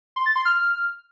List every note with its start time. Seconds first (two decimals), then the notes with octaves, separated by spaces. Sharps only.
0.16 C6
0.26 A6
0.36 C6
0.45 F6